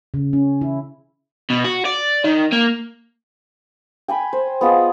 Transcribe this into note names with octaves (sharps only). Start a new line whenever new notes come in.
C#3
C#4
E4
B2
F#4
D5
D#3
A#3
G5 G#5 B5
C5
B3 F4 G#4 D#5